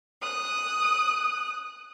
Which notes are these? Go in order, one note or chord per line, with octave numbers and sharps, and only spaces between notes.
D#6 F#6